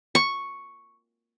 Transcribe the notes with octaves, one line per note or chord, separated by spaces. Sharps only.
C#6